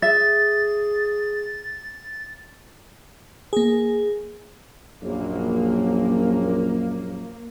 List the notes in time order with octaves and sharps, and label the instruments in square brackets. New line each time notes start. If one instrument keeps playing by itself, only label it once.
[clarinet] G#4 [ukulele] E5 [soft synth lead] A6
[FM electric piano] A#3 G#4
[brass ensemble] A#1 F#2 [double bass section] A#3